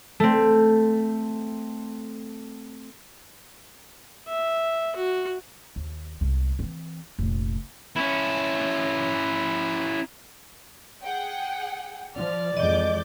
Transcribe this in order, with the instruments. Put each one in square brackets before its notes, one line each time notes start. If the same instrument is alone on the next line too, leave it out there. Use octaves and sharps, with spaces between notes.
[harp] A3 C4
[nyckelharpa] E5
F#4
[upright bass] D#2
C2 G#3
E3 C4
F1 A#1
[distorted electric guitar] C#4 E4
[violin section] G#4 F#5 G5
[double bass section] F3 [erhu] D5 [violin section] F6
[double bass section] F2 E3 G#3 [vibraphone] D#5 [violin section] D6 G6 A6